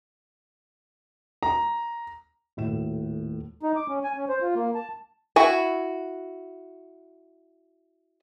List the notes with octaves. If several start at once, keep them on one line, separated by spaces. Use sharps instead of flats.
A#5
D#1 A2 F#4 E7
D#4
D6
C#4
G#5
C#4
C5
F4
A#3
A5
E4 F#4 G#5